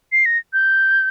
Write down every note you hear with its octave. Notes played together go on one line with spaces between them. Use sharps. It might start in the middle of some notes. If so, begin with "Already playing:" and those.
C7
A#6
G6